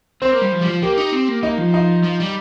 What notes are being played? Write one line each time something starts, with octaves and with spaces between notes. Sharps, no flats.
C4 C5
A#3
G3
F3
G3
F3
A#3 G4
D#4
C4
A#3
A#3 D#4
F3
D#4
F3
G3